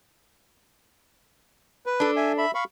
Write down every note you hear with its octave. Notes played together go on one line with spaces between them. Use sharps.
B4
D4 A4
E5 G#5
E5 B5
F5 B5 C#6